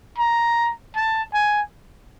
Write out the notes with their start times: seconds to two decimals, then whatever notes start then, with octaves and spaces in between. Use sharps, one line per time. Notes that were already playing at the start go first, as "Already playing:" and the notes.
0.18 A#5
0.96 A5
1.34 G#5